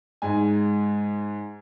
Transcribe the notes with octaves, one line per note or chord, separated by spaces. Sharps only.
G#2 G#3 G#5